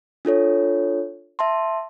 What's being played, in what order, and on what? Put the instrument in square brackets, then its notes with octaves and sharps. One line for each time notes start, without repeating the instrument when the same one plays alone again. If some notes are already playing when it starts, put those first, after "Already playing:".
[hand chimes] D4 F4 A4 C#5
E5 A5 C6